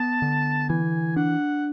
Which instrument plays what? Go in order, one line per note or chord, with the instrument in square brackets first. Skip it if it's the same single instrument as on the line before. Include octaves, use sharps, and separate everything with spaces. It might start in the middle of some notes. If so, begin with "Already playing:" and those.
Already playing: [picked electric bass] B3 [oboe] A5
[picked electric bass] D3
[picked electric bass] E3 [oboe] G#5
[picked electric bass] D4 [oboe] F#5